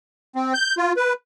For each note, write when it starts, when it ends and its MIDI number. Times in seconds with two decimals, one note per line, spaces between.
0.36 0.53 60
0.54 0.75 91
0.78 0.93 65
0.97 1.13 71